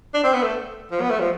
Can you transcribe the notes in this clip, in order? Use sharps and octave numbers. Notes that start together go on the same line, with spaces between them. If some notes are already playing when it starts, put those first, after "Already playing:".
D4
C4
B3
A3
F3
B3
A3
F3